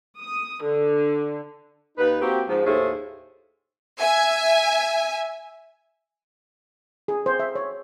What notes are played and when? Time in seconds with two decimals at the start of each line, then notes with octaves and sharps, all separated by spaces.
0.19 D#6
0.62 D3
1.98 D#2 D#4 B4
2.20 A#3 C4 F#4 G4
2.48 G#2 F3
2.65 D#2 A2 A3 G#4 C5
4.00 E5 G#5
7.08 G#4
7.26 C5
7.40 E5
7.55 C#5